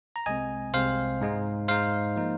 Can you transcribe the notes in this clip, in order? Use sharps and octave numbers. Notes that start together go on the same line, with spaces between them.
A#5
C2 C3 G#3 C4 D#5 G#5
C2 C3 G#3 C4 C5 F5
G#2 G#3 D#4
G#2 G#3 D#4 C5 F5
F3 A#3 D#4